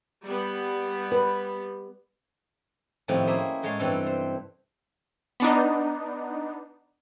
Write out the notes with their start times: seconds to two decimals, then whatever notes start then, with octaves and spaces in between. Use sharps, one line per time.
0.23 G3 B3
1.12 B4
3.08 A2 C3 D#3 F3 C4 E4
3.27 A#3 C#4 G#4 C5 E5
3.63 A2 G#3 C#5 A5 C6
3.79 G2 C3 E3 G3 A4
4.07 C5
5.40 B3 D4 D#4